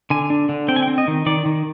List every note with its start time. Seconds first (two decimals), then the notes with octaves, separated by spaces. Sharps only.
0.10 D3 G#5
0.30 D4
0.49 D3
0.68 C4 G5
0.76 G#5
0.83 G5
0.88 C4
0.98 D#5
1.08 D#3
1.26 D#3 D5
1.45 D#3